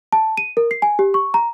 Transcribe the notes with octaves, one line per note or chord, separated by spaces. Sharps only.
A5
D#7
A#4
C7
G#5
G4
C#6
A#5